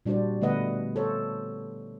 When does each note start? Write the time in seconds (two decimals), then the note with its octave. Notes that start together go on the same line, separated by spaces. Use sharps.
0.06 A#2 G3 D4 F#4 C5 D5
0.41 D3 A3 B3 B4 D#5 F#5
0.96 A4 C5 C#5